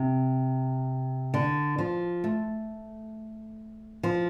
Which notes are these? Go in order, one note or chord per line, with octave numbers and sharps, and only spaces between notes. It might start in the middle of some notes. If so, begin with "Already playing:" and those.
Already playing: C3
D3
F3
A3
F3